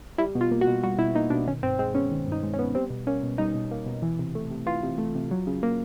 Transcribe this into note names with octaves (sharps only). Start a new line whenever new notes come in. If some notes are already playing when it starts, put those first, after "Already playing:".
G3 E4
B2
F4
A#3
F#4
B2
G3 F#4
B2 E4
A#3 D#4
B2 D4
D#3 C#4
G2 C4
G#3 C4
B3 C#4
D#3
G2 D#4
G#3
C#4
B3
G3 C4
B2
A#3 C#4
B2
G3 D#4
B2
A#3
B2
E3
C3
A3
C3
E3 F4
C3
A3
C3
F#3
C#3
A#3